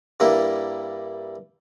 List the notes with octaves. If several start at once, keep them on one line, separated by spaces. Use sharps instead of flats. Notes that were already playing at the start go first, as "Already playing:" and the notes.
G2 G3 A#3 E4